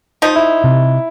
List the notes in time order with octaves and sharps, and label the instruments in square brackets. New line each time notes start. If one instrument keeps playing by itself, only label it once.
[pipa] F3 D#4
[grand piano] E4
[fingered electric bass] C3